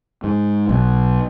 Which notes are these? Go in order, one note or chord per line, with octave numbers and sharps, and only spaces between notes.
G#2
B1